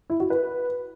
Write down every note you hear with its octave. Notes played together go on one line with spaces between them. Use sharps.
E4
F#4
B4